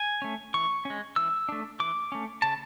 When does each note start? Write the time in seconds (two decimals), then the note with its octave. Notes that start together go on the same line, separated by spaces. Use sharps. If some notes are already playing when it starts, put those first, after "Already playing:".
Already playing: G#5
0.22 A3 C#4
0.54 E3 C#6
0.85 G#3 C#4
1.16 E3 E6
1.49 A3 D4
1.80 E3 D6
2.12 A3 C#4
2.42 C#3 A5